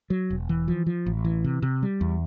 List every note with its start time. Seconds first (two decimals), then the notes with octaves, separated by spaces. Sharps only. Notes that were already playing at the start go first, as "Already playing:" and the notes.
0.10 F#3
0.30 E1
0.49 E3
0.68 F3
0.86 F3
1.06 A1
1.25 E3
1.44 C3
1.62 C3
1.83 G3
2.01 E2